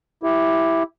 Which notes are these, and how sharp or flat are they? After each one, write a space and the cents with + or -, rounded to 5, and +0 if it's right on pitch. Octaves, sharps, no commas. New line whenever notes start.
E4 +0 G4 +0